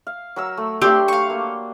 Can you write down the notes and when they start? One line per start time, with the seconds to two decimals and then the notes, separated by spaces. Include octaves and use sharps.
0.07 F5
0.36 F#3 A#4 E6
0.57 A3
0.82 A3 C4 D4 G4 C6
1.08 F5 C#6
1.30 A#3